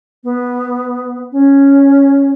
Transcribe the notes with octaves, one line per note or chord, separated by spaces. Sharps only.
B3
C#4